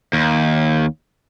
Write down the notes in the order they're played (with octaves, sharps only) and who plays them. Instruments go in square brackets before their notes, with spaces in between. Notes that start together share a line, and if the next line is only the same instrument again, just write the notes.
[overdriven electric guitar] D#2